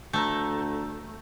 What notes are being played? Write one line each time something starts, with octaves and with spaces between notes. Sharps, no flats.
D2 A3 A#5 E6 G6